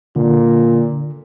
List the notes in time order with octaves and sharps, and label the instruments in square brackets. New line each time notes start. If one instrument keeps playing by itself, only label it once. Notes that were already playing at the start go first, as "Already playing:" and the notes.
[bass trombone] A#2 [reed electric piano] D3